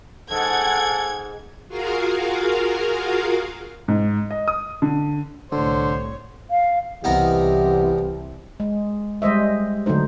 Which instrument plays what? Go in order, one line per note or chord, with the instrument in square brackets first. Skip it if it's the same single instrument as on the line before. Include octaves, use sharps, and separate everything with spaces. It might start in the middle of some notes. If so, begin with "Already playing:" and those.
[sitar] G#2 [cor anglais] A4 [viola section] F#5 G5 [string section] G#6
[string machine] F4 F#4 G#4 A#4 F5
[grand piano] G#2
D#5
D#6
D3
[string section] C2 A2 C#5 [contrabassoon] D3 [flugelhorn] C5
[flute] F5
[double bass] C2 [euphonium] E3 [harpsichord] B3 D#4 A#4 [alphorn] G4
[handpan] G#3
G3 G#3 C5 D#5 E5
D3 F#3 A3 D#4 C5